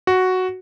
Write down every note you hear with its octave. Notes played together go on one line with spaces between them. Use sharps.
F#4